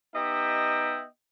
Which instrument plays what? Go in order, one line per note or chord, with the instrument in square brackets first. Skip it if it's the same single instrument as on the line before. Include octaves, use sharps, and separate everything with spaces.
[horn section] B3 D#4 G4 D#5 E5 G5